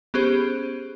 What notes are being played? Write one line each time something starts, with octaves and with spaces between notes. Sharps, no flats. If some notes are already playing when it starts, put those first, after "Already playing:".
B3 C#4 G4 G#4 C5